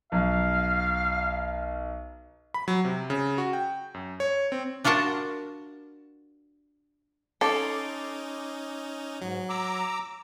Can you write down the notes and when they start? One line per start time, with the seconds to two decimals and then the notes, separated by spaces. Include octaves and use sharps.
0.12 B1 F5
2.54 B5
2.68 F#3
2.85 C3
3.10 C#3
3.38 F#4
3.53 G5
3.94 F#2
4.20 C#5
4.52 C4
4.84 D4 F4 F#4 A#4 A5
7.41 C#4 D#4 A4 C6 D6
9.22 G#2 F#3
9.49 A#5 D6 E6